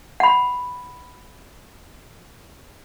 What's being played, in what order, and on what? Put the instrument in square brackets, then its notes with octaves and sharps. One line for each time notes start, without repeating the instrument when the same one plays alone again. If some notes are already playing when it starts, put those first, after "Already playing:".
[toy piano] F#5 B5